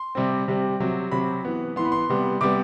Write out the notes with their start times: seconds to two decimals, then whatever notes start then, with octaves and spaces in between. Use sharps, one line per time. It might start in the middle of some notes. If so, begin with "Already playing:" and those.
Already playing: C6
0.15 C3 G3 C4
0.48 C3 G3 C4
0.80 C3 F#3 C4
1.11 C3 F#3 C4 B5
1.45 E3 B3
1.76 E3 B3 C6
1.85 B5
1.92 C6
2.10 C3 G3 B3
2.41 C3 G3 B3 D6